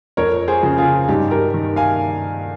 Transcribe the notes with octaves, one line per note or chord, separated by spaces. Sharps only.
F2 A#4 C#5
G#4 C5
C#3 F3
F4 G#4
G2 D#4 G4
G4 A#4
D#3
F5 G#5